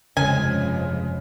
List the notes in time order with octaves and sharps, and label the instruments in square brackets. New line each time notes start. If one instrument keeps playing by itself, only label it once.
[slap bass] F1 [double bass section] G2 F3 G#3 [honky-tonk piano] C#3 [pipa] G#5